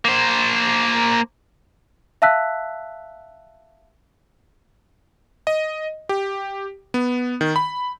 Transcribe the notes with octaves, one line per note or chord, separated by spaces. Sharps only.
A#3 C5
E5 F5 A5 E6 F#6 B6
D#5
G4
B3
D#3
B5